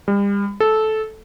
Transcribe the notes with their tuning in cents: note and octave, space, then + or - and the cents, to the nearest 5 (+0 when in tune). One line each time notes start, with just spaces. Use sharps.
G3 +40
A4 -15